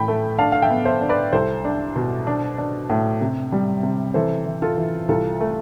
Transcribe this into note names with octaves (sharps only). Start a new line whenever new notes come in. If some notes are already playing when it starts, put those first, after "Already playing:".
Already playing: A2 E3 G5 B5
A3
D4 F5 A5
F5
E5 G5
B3
C5 E5
D4
B4 D5
C2 A4 C5
D4
B2
D4
D4
A2
C3
G3
C3
E3 A4 C5
E3
F4 A4
E3
C2 F4 A4
A3